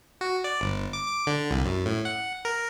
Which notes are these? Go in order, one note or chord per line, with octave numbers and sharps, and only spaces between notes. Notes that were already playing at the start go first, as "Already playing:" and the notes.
F#4
D5
G1
D6
D6
D3
C2
F#2
A2
F#5
A#4